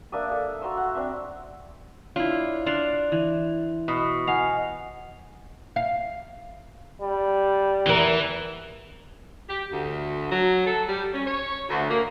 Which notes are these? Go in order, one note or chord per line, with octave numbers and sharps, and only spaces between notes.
A#3 D4 E5 D#6
A4
F#4 A#5 C6 E6
F#5
C4 D4 E5
D4 E4 F4 C#5
D4 D5 F5 C6 F#6
E3
B2
D#5 F5 F#5 G#5
F5
G3
E2 E3 A#4
G4
D2
F#3
A4
G3
C#4
C#5
D2
A#3